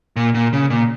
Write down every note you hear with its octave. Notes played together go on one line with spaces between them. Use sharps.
A#2
A#2
C#3
A#2